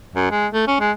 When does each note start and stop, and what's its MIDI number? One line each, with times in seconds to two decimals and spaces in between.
0.14 0.29 42
0.31 0.47 56
0.53 0.66 57
0.67 0.75 61
0.79 0.91 56